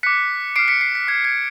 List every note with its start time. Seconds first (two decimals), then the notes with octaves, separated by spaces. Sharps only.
0.03 D6 F#6 B6 C#7
0.56 D6 F6 C7 D7
0.68 B6 C#7
0.81 C7
0.95 B6
1.08 D6 F#6 G#6
1.25 G#6